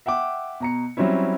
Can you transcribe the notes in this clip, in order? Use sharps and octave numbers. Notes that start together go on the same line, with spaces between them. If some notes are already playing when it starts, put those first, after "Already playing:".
E5 F#5 G5 D6
B2 A#5 C#7
F#3 G3 C4 C#4 E4